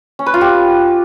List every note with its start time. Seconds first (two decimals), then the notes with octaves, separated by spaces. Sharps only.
0.19 C#4
0.26 B4
0.34 F4
0.41 G4